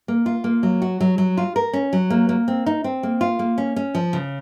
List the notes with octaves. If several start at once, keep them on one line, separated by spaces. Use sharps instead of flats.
A#3
F4
A#3
F#3
F#4
F#3
F#3
F4
A#4
C#4
F#3
A#3
A#3
C4
D#4
C4
A#3
F4
A#3
C#4
C#4
F3
C#3